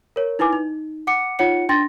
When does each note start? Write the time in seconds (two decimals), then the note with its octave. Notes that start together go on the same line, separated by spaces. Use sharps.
0.16 A#4 C#5
0.39 D#4 E4 B4 G#5 D6
0.53 D#4
1.07 F#5 D6 C#7
1.39 D#4 F4 C#5 F#5 C#7
1.69 D4 G5 C6 A6 A#6